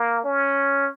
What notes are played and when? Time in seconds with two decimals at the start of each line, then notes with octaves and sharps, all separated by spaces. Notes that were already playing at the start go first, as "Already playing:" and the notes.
Already playing: A#3
0.24 C#4